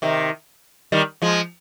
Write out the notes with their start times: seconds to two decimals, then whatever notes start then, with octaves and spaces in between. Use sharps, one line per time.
0.02 C3 D#3
0.92 D#3 G3
1.22 F3 G#3